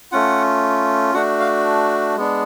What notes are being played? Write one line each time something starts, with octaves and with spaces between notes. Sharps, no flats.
A3 C#4 F4 F#5
A3 D4 F#4 F#5
F5
G#3 B3 D4